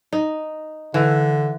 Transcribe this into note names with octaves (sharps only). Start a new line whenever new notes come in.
D#4
D3 E3